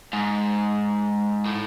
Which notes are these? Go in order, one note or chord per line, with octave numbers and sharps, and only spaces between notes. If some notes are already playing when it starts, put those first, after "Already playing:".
G#2
A2